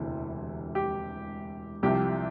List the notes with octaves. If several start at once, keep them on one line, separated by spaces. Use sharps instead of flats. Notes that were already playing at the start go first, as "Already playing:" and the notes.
Already playing: E1 D2 C3 E3
G4
C2 C3 F3 G4